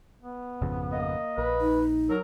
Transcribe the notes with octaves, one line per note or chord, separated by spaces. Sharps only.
B3
G#1 F2 C#3
A#3 D#5
A#1 B4
D#4
F#3 A4 A#4